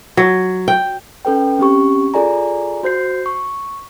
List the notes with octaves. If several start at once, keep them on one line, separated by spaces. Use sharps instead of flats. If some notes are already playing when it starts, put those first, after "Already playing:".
F#3
G5
C#4 A4 B4 G5
C4 C#4 G4 C#6
F4 G#4 A4 D5 G#5 A#5
F#4 C5 G6 C7
C#6